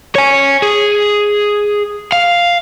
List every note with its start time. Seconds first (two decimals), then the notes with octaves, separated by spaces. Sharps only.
0.15 C#5 G#5
0.62 G#4
2.12 F5